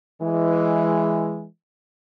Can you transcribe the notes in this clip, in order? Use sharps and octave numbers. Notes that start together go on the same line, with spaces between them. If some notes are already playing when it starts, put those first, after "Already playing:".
E3 G#3